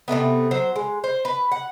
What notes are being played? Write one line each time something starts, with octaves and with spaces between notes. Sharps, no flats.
C3 D#3 A3 B3
F#3 C5
G#3
C5
B4
F#5